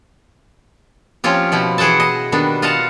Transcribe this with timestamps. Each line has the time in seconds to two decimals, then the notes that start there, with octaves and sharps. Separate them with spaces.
1.24 F3 C4 C#4 F4 G4
1.52 B2 F3 E4
1.78 E3 G#4 F#5 G5 A5
2.00 D#5
2.32 D#3 G3 B3 D4
2.62 F4 D#5 F5 F#5 A5